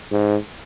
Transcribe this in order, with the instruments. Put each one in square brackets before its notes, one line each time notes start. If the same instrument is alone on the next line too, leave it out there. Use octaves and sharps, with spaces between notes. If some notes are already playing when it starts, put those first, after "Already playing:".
[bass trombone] G#2